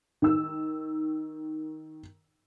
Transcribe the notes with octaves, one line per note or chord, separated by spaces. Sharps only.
D#3 E6